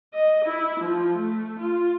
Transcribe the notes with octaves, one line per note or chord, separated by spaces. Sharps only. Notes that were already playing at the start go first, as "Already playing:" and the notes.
D#5
E4
F3
A3
F4